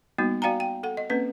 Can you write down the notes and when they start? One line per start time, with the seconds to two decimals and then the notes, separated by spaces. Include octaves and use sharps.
0.18 G3 A#3 B3 D#4 F#4
0.42 F#4 D5 F5 G5 G#5 A#5
0.60 G5
0.83 A4 F#5
0.97 D#5
1.10 A#3 C4 C#4 B4